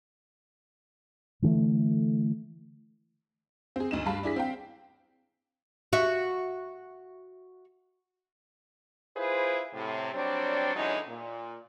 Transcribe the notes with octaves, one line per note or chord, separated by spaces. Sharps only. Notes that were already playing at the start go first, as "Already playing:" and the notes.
D3 E3 G3 A3
C4 G#4
D2 D#4 E7
G2 F5 A5 B5
D4 E4 G#4 B6
C4 F5 G5
F#4 E5
E4 F4 G#4 B4 C5
A2 C3
F#3 G3 C4 D4 C#5 D5
D3 E3 F#3 G#3 C#4 D#4
A#2